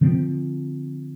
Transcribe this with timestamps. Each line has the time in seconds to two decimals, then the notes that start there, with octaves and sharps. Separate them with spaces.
0.01 D3 F3 C4